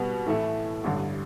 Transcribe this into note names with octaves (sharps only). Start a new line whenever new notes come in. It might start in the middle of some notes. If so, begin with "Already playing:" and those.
Already playing: B2 G3 B3
A2 E3 A3 E4
A1 G2 D3